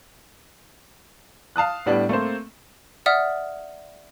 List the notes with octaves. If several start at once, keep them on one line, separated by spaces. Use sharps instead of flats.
F5 A5 D#6 F#6
A2 G3 B3 D4
A3 A#3 C4 C5
D5 E5 F#5 D#6 F6